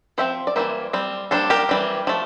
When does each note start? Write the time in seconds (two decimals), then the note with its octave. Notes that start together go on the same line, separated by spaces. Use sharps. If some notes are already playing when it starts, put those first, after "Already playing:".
0.18 F3 C4 C5 E5
0.47 D5
0.56 E3 G3 A#3 C5 E5
0.93 G3 C4
1.31 G3 A#3 D4 A4 C5
1.50 G4 A#4
1.69 E3 G3 C4
2.07 F3 A3